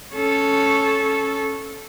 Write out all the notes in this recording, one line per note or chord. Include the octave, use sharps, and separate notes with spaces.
C#4 A4